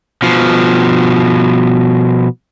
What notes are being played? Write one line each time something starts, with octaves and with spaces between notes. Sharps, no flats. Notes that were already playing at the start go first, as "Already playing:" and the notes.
B2 F3